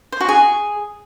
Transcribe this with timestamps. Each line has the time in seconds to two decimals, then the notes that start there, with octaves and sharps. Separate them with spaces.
0.12 C5
0.21 F#4
0.29 G#4